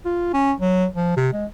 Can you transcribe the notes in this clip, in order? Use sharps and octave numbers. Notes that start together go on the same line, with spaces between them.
F4
C#4
F#3
F3
C3
G#3